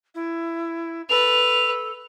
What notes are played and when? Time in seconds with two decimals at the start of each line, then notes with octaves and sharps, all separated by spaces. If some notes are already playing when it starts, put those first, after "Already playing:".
0.14 E4
1.09 A4 B4 F7